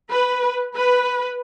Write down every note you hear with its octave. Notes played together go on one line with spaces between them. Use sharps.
B4
B4